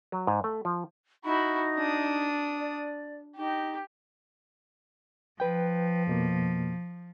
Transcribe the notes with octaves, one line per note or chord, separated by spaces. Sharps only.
F#3
G#2
A3
F3
D#4 E4 F#4
D4 D#6
D5
D#4 G4
F3 B4 G5
F2 B2 A#3